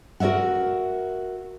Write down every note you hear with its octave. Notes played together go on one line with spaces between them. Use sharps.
F#4 A#4 D5 E5 F#5